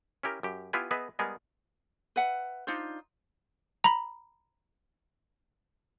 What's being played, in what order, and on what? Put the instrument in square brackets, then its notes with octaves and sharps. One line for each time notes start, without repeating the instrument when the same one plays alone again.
[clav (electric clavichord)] C#4 E4 G4 A#4
F#2 G4
B3 E4 F4 G4 B4 G#5
B3 G#4 B4 D#5 E5
G3 G#3 B3 G#4 A#4
[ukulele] B4 E5 F#5
D4 D#4 F4 C5
[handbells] A#5 B5